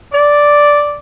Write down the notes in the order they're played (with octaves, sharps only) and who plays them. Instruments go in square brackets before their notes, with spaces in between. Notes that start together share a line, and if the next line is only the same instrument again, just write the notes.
[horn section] D5